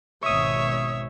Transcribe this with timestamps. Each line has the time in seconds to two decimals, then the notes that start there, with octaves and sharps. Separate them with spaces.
0.23 G#1 B2 C#5 E5 C#6 D#6